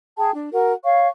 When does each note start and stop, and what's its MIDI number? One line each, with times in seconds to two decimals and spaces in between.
0.17 0.30 68
0.17 0.30 79
0.17 0.30 81
0.34 0.49 62
0.52 0.73 66
0.52 0.73 70
0.52 0.73 78
0.84 1.08 73
0.84 1.08 77
0.84 1.08 85